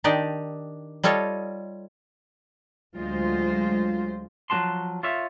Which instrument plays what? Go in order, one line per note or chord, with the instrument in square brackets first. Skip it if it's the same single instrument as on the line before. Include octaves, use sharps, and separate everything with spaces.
[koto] D#3 D4 D#4 G4 D5 D#5
G3 F4 A4 C#5 D#5
[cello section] D2 F#3 G#3 F4 C5
[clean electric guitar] F3 F#3 A#3 F#4 A5 C6
F4 C#5 E5